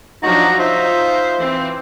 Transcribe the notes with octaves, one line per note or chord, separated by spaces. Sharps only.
F3 F#3 D4 D#4 F#4 A#5
D#4 F4 C5 E5
E3 C4